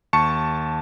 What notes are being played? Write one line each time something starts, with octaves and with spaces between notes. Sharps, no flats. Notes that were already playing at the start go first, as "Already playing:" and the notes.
D#2 A5 C#6 C#7